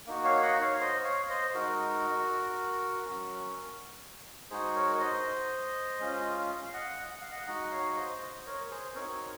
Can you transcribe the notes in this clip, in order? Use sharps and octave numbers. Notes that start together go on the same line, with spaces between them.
A#3 D#4 F#4
C#5 F5
D#5 F#5
C#5 F5
C5 D#5
C#5 F5
C5 D#5
G#3 D#4 F#4 A#4
F#3 C#4 F#4
G#3 D#4 F#4 G#4 C5
A#4 C#5
C5 D#5
G#3 C#4 F4
F5
D#5 F#5
F#5
F5
D#5 F#5
G#3 D#4 F#4 D#5 F#5
C#5 F5
C5 D#5
C5 D#5
A#4 C#5
G#4 C5
C4 D#4 F#4 A#4 C#5